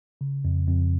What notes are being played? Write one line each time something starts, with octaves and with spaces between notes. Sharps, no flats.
C#3
F2
F2